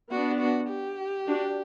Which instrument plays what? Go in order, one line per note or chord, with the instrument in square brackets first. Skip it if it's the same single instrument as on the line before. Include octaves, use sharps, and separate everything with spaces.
[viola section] B3 D4 [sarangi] F#4
[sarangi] F#4
G4
[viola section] D4 F#4